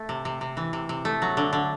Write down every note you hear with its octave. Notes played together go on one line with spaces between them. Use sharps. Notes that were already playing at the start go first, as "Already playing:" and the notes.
Already playing: A3
C3
C3
C3
E3
C3
C3
A3
F#3
D3
D3